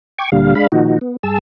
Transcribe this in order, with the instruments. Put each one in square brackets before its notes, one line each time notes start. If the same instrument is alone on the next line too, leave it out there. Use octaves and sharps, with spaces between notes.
[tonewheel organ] G5 C#6 D6 G#6
D2 A#2 D3 G3 F5
G#3 D4 F5 B5
A#2 D#3 F3 D#4 F#4
B3
G2 G#4 A5 E6